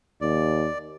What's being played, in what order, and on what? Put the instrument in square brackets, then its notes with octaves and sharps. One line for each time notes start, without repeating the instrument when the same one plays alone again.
[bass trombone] D#2 [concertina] D5